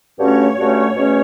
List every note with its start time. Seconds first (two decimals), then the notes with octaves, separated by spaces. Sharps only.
0.17 G2 D3 A3 C#4 F#4 C#5
0.56 G2 D3 A3 C#4 F#4
0.96 E2 B2 A3 C#4